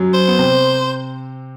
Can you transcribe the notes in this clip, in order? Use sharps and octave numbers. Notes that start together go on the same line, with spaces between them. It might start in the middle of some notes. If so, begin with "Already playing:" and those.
Already playing: F#2 F#3
C5
B3
C3 C4